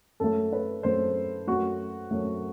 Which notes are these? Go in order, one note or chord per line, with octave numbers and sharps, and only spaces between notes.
F#2 F#3 A3 A4
B4
F#2 F#3 A3 C5
F#2 F#3 A3 F#4
F#2 F#3 A3